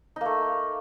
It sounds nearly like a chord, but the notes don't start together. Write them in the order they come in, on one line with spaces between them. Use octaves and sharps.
D#4 A#3 A3